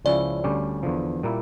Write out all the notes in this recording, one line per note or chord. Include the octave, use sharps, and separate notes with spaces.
C#2 C#3 F3 C#4 E4 D5
D2 D3 G3 C#4 G4
E2 D3 F3
A#2 G3 A#3 E4